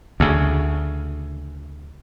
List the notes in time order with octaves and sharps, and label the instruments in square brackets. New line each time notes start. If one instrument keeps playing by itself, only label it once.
[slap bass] D2 C#3